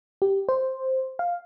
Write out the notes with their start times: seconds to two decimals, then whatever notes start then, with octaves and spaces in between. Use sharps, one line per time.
0.22 G4
0.49 C5
1.19 F5